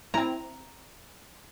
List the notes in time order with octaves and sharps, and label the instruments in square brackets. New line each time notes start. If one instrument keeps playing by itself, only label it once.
[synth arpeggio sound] C4 E4 [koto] A#5